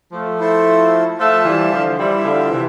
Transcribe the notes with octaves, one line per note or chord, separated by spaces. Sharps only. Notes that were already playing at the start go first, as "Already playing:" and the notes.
F3 A3
E4 A4 C5
F3 A3 F4 C5 E5 A5
E3 G3
D3 F3
E3 G3 E4 G4 C5 E5
D3 F3
C3 E3